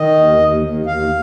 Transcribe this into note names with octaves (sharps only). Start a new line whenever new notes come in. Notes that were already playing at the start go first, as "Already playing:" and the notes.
Already playing: D#3 D#5
D#2
D#2
D#2
D#2 F5